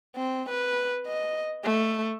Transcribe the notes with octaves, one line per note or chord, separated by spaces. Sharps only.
C4
B4
D#5
A3